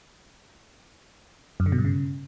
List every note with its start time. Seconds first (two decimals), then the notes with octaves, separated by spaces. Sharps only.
1.60 F#2
1.66 D3
1.72 B2
1.79 G2
1.85 C#3